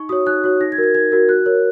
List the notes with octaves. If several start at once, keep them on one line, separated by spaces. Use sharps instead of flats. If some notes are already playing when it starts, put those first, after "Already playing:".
Already playing: D#4 C#6
F#4 C#5 D#6
D#4 F#6
F#4 C#5
D#4 A#6
G#6
F#4 A#4
G#6
D#4 G#6
F#4 A#4
F#4 F#6
A#4 C#5